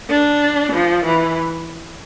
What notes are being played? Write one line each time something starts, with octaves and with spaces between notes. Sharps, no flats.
D4
F3
E3